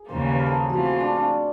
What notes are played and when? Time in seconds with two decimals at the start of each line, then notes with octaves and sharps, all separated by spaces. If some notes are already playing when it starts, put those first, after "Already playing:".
Already playing: G#4
0.08 D#2 C#3 E3 G3 A#3 C5
0.33 B4
0.39 A#4
0.46 A4
0.54 G#4
0.69 E3 A3 C4 F4 F#4
0.85 G4
1.00 D4
1.16 C#4